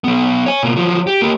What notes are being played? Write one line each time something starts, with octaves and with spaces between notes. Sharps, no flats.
F#3 B3
C#5 G#5
B2 A#3
F3 F#3
G4
A#3 G4